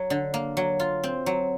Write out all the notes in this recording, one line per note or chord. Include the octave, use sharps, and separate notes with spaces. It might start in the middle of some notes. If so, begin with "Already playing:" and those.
Already playing: F#3
D3
A#3
F#3
F4
C4
F#3